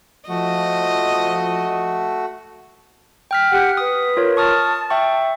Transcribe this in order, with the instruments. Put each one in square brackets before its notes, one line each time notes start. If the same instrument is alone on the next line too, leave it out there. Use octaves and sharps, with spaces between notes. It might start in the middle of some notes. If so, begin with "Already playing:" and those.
[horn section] F3 [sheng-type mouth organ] A3 F#4 [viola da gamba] D#5
[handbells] G5 F6 B6
[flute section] G4 F#5
[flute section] B4 [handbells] D#6
[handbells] F4 A#4 C#5
[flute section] A5 [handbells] C#6 D#6 F6
[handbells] E5 G5 C#6